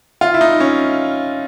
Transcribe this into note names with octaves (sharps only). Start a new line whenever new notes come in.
F4
E4
D#4
C#4